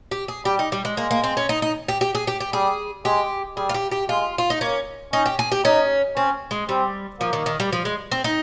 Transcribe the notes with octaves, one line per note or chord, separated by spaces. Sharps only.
G4
G#4
G3 G4
D#4
G3
G#3
G#3 A#3
A#3
C4
C#4
D#4
D#4
G4
G4
G#4
G4
G4
G3 G#4
G#3 G4
G3 G#4
F4
G4
G4
G#3 F4
F4
D#4
A#3 C#4
C#4 D#4
G4
G#4
G4
C#4 D#4
C4 C#4
G#3
G3 C4
F3 A#3
D#3
D#3
G3
F3
G#3
C4
D#4